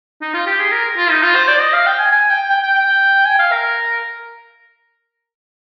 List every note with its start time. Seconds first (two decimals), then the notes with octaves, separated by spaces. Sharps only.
0.22 D#4
0.34 F4
0.47 G4
0.59 G#4
0.72 A#4
0.97 F4
1.10 D#4
1.23 F4
1.35 C5
1.48 D5
1.61 D#5
1.73 F5
1.86 G5
1.99 G#5
2.12 G#5
2.30 G5
2.50 G5
2.63 G5
2.75 G5
3.26 G#5
3.39 F5
3.52 A#4